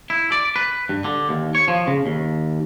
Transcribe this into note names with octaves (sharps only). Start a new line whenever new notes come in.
E4
D5
B4
G2
D3
D#2
C#5
F3
C#3
D#2